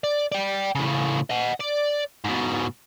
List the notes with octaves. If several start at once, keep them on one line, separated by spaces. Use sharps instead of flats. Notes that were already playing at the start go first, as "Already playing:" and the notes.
D5
D5 G5
A2 C#3
D#5 F#5
D5
G#2 B2